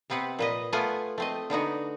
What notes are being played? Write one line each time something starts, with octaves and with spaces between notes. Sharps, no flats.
C3 B3 C4 B4 F#5
A#2 B4 D#5
A3 B3 F4 F#5 G#5
A3 C4 D#5
D3 B3 D#4 F#4